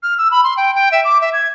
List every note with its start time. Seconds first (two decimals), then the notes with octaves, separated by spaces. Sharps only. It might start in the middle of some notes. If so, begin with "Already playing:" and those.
0.03 F6
0.18 E6
0.31 B5
0.44 C6
0.57 G5
0.75 G5
0.92 E5
1.04 D6
1.21 E5
1.33 G#6